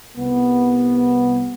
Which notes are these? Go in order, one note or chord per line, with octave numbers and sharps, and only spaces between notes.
C2 B3